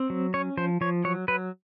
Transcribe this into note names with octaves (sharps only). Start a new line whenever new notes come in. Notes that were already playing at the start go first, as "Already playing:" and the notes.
Already playing: C4
F#3
C#4 C#5
F3 C5
F3 C#5
F#3 C#5
F#3 B4